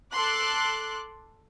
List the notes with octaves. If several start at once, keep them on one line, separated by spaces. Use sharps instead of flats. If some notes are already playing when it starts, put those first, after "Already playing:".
A4 C6 D6 F#6